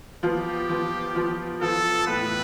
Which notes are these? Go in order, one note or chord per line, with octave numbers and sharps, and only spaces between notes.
F3 B3 F4 G4
F3 B3 F4
F3 B3 F4
F3 B3 F4 A4
A2 E3 B3 F4 B4